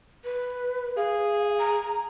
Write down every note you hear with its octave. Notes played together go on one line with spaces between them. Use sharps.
B4
G#4 F5
A#5